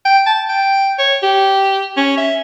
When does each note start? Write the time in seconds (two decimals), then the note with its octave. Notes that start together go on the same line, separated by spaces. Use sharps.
0.05 G5
0.26 A5
0.49 G5
0.99 C#5
1.22 G4
1.97 C#4
2.17 E5